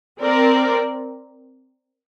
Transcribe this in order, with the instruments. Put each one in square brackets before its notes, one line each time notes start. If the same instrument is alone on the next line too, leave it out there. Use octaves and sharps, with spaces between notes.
[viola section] C4 A#4 D5